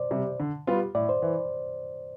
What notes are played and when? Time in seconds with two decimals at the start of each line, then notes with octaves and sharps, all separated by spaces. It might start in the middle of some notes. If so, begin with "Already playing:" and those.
Already playing: C5 D5
0.11 C3 G3
0.40 D3
0.67 G3 B3 F4
0.95 A2 D5
1.09 C5
1.22 E3